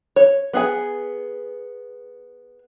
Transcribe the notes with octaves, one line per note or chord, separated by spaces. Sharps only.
C#5
B3 G#4 G#5